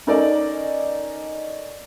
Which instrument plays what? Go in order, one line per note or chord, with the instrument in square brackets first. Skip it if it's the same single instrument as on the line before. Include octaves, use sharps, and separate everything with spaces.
[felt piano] C#4 D#4 A4 A#4 D5